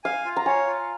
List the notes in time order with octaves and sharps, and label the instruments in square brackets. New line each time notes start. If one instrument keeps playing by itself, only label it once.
[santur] F5 [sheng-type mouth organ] G#5
[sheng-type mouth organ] F4
[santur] A#5
[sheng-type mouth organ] C#5 [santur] G#5
[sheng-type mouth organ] F4